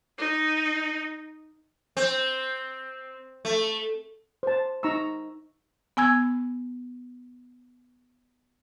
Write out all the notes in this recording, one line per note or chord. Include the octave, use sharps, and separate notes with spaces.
D#4
C4
A3
C5 A5
D#4 A#5 C#6 E6
B3 G#5 E6 G#6